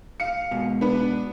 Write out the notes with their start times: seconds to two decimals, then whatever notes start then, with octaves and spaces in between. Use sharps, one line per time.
0.20 F5 C#7
0.51 G#2 B2
0.81 B3 D4 B4